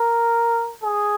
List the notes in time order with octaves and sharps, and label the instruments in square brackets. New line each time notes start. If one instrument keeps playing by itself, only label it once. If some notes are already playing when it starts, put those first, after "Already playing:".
Already playing: [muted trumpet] A#4
G#4